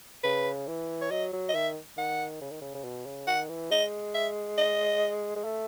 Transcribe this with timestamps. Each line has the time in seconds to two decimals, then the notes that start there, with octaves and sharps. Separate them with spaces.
0.24 C#3 B4
0.68 E3
1.02 C#5
1.11 F#3 D#5
1.33 F#3
1.49 D#5
1.54 D#3 E5
1.97 D#3 F#5
2.42 C#3
2.51 D#3
2.61 C#3
2.75 C#3
2.84 B2
3.06 C#3
3.27 D#3 F#5
3.49 E3
3.71 G#3 D#5
4.14 E5
4.58 D#5
5.36 G#3
5.45 A3